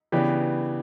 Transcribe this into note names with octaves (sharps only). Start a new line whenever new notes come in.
C#3 E3 B3 D4 G4